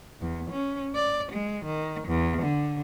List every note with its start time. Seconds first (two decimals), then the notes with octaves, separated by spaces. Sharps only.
0.21 E2
0.51 C#4
0.95 D5
1.32 G#3
1.65 D#3
2.08 E2
2.42 D3